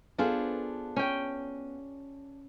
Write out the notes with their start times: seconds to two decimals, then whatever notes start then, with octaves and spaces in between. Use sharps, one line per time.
0.18 B3 D4 F4 G#4 A4 C5
0.96 C#4 G5